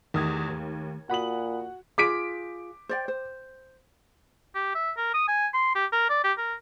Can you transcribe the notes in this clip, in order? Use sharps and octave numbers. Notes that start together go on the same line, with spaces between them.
E2 D#3 A3 G4 D#6 G#6
D#2
A#2 F#4 F#5 B5 D#6 F#7
F4 G#4 D6 B6 D7
C5 D5 G5
C5
G4
E5
A#4
D#6
G#5
C6
G4
A#4
D5
G4
A#4